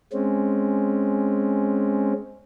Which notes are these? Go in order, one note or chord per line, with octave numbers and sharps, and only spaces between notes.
G#3 C4 C#4